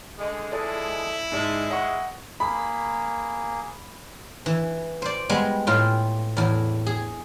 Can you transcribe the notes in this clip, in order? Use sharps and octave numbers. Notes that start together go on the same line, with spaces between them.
D3 G#3
F3 G#3 E4 A4 D5
G#2 G#3 D5 A5
D#5 F#5 C#6
A#3 G#4 B5
E3
C5 D5
G3 G#3 B3
A2 F4 G5
E2 A2
G#4